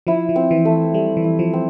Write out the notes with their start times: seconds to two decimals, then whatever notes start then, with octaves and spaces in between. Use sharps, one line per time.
0.07 F3 E4
0.29 F3
0.36 C4
0.51 E3
0.65 A3
0.94 G3 A3
1.17 E3
1.24 E4
1.39 F3
1.53 C4